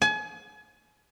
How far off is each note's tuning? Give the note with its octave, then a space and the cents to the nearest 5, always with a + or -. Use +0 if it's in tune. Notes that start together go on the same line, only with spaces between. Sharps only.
G#5 +35